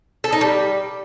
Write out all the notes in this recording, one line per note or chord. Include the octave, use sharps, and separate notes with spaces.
A4
D#4
G3